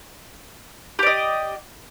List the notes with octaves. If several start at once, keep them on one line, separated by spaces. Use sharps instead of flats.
G4 D5 D#5